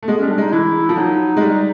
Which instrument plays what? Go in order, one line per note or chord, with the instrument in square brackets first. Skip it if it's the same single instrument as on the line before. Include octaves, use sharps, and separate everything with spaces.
[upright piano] A3
[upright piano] G#3 [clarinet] B3
[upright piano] G3 [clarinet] C#4
[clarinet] D4
[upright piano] G#3 [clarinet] D#4
[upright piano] E3 [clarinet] E4
[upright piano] F3
[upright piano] F#3 [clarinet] D#4
[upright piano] G#3
G3